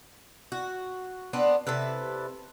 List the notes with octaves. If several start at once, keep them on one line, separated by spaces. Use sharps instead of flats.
F#4
B3 C4 D4
C3 E4 A4 B4